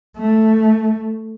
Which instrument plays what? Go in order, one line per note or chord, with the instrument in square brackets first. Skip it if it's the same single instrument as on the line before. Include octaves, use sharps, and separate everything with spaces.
[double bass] A3